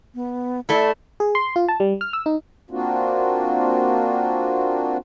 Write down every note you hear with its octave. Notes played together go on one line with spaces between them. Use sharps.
B3
A3 E4 D5
G#4
C6
F4
A5
G3
F6
E6
D#4
A#3 C4 D4 F4 F#4